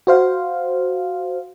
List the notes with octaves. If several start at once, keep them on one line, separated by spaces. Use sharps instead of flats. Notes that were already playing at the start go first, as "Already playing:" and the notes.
F#4 C5 F5